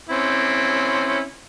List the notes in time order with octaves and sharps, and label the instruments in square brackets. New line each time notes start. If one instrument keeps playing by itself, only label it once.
[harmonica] C4 C#4 E4